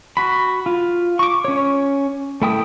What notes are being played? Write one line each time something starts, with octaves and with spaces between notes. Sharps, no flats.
F#4 B5
F4
C#6 D6
C#4 C#5
A3 E4 G5 D#6